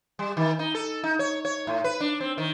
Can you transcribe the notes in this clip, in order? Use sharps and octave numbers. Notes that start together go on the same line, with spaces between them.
G3
D#3
D#4
A4
D#4
C#5
C#5
A2
B4
D4
C4
D#3